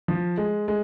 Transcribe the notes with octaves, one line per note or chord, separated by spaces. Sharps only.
F3
G#3
G#3